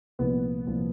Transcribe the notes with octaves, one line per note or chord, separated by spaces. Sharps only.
C2 A#2 F3 B3
C2 A#2 F3